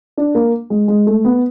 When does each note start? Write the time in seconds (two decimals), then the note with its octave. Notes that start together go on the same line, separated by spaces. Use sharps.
0.17 D4
0.35 A#3
0.70 G#3
0.88 G#3
1.07 A3
1.25 B3